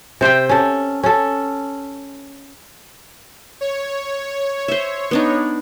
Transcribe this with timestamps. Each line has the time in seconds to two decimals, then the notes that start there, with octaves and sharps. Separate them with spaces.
0.21 C3 C5 E5 G5
0.49 C#4 A4
1.03 C#4 A4
3.61 C#5
4.68 C5 E5
5.11 B3 D4 D#4